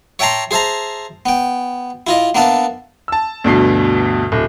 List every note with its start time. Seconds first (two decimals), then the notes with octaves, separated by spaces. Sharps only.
0.19 C#5 E5 G5 A5 A#5 C6
0.51 G#4 C5 E5 A5 A#5
1.26 B3 G5
2.07 E4 F4 D#5
2.35 A#3 B3 D4 E5 A5
3.08 A5 E6
3.44 D2 G2 B2 C7
4.32 D1